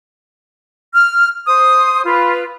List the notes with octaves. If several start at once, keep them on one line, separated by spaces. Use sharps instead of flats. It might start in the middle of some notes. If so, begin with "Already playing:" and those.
F6
C5 D#6
F4 B4